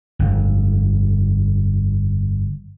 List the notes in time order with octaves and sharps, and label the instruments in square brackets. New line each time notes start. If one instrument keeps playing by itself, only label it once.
[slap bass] G1 F2